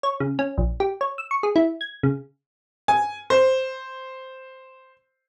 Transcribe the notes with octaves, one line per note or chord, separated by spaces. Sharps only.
C#5
C#3
C#4
A#1
G4
C#5
E6
C#6
G#4
E4
G#6
C#3
G#5
C5